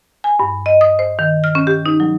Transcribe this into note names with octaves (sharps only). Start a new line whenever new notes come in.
G#5
G2
D#5
D#6
C5
D#3
F6
C#4
G4
D#4
F#3